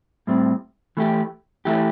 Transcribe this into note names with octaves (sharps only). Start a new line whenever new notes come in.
A2 G3 C4
E3 A3 E4 G4
E3 A3 E4 G4